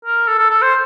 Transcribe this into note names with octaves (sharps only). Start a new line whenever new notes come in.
A#4
A4
A4
A4
C5